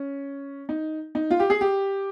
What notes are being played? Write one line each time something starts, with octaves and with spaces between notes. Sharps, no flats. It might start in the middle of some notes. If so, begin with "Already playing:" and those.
Already playing: C#4
D#4
D#4
F4
G4
G#4
G4